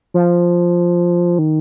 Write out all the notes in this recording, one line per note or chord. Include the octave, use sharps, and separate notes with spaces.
F3
D#3